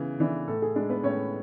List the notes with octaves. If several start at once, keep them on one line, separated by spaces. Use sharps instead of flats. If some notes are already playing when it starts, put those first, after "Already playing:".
Already playing: C#3 E3 B3
E3 B3 D4
A2 A4
G#4
G#3 D4 A4
B3 B4
A2 C#4 C#5